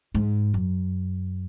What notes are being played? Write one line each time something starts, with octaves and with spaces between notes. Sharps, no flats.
G#2
F#2